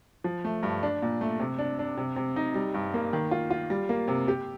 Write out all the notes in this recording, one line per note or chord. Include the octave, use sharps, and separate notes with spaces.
F3
A3
G2
D4
A#2
A3
C3
D4
D4
C3
C3
D#4
G3
G2
A#3
D#3
F4
F4
G3
A#3
C3
G4